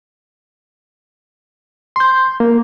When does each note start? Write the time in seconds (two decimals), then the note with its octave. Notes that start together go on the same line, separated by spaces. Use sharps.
1.96 C6 G6
2.40 A#3